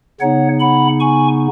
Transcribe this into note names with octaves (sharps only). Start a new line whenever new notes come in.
C#3 B3 D#4 C#5 F#5
F#5 B5
G#5 C#6